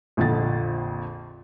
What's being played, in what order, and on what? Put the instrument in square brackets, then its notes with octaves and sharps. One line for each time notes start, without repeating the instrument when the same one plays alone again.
[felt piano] A#1 F2 D3 A6